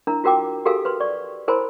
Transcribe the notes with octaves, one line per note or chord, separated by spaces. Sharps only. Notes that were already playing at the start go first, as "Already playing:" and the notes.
D4 E4 A#4 A#5
F4 F#4 A#4 G5 D6
F#4 G4 A4 A#4 F5 G#5
B4 C6
D5 C#6
E4 A#4 C5 G#5 B5 C6